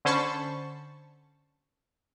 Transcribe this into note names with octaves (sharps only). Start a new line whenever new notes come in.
D3 C#4 C5 A5 B5 C#6